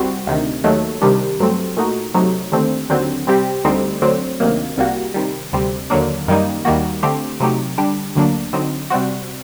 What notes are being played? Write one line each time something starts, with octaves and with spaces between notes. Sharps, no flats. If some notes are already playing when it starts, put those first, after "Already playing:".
Already playing: C2 C3 G3 C4 F#4
D2 C3 D#3
D#2 D#3 F#3 A3
C3 D#3 G3 D4 G4
G2 F#3 A3 C4
A#2 A3 D#4 F#4
C3 F#3 A3 D#4
D#2 D3 A3 C4
D#2 D3 F#3 C4
C3 G3 C4 G4
D2 D3 G3 C4 D#4
D2 D3 F#3 C4
D2 C3 D#3 F#3 A#3
C2 C3 G3 A#3 F#4
C3 D#3 G3
D2 C3 G3 C4
D#2 D3 F#3 A#3 D4
F#2 D#3 G3 A#3 D#4
D#2 D#3 G3 A#3 F#4
D3 A3 C4 G4
C3 F#3 A3 D#4 G4
D3 G3 D4 G4
D2 D3 F#3 A#3 D4
D3 F#3 C4 D#4
C3 G3 C4 F#4